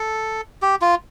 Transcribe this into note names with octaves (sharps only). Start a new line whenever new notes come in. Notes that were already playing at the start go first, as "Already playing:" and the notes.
Already playing: A4
G4
F4